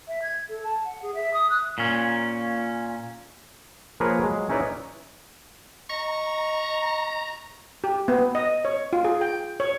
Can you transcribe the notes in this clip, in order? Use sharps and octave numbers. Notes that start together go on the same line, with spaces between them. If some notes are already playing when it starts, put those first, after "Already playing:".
E5
G#6
A4
A5
F#5
G#4
E5
D#6
F#6
A#2 C#4
F3 A#3 G#4 A#4 B4 C#5
F#3 G#3
C#4 D#4 E4 B4 C#5 D5
D#5 A#5 C#6
G4
B3
D#5
C#5
F4
G#4
G5
C#5